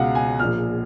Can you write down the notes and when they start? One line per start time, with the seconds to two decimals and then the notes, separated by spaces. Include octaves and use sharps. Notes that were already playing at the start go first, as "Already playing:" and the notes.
Already playing: C#2 B2 F5 F#5
0.15 G#5
0.39 A#1 A#2 F6